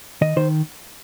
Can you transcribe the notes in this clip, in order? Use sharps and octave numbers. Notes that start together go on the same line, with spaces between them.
D#3 D#5
D#3 C5